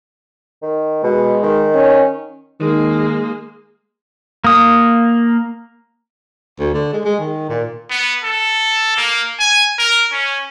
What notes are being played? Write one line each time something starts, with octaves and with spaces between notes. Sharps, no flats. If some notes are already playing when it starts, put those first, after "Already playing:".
D#3
B2 G#3
D#3
C#4
D#3 G#3 A#3
A#3 D#6
D2
D3
G#3
G#3
D#3
A#2
B3
A4
A#3
G#5
A#4
C#4